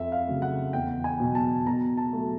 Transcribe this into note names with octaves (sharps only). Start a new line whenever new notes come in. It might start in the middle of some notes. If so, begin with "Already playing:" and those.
Already playing: F2 E5
F5
C#3 F#3 A3
F#5
E2 G5
G#5
B2 F#3
A5
B2 A#5
A5
F#3 A3